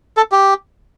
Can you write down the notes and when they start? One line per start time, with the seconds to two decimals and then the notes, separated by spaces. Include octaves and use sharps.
0.17 A4
0.32 G4